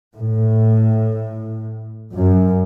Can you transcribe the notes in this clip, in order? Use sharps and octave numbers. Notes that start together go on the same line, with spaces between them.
A2
F#2